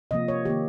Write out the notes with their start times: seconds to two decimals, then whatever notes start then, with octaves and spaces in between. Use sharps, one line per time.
0.11 C3 F3 A#3 D#5
0.28 C#5
0.45 D#3 A#3 G4